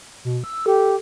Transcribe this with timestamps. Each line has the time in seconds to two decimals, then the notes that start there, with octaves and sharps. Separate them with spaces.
0.25 B2
0.44 E6
0.66 G4 A4